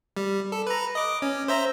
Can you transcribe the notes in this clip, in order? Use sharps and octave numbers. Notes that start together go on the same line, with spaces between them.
G3
A4
B4 A#5
D#5 D6
C#4
C5 E5 A#5